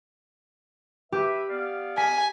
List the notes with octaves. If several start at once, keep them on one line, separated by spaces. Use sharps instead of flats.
G4 B4 E5 B5
B3 D5 F5
G#5 B6